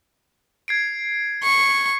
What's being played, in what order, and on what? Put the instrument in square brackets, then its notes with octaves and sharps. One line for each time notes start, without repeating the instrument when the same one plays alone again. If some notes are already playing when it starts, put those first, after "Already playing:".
[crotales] G#6 C7 D7
[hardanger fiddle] C#6